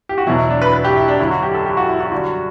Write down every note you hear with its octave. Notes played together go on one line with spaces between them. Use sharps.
G4
F#4
E2 B2 F#3 E4
E4
D4
B4
B4
G4
E4
D4
F#2 D3 F#3 E4
F#4
G4
A4
G4
F#4
E4
F#4
F#2 D3 G3 F#4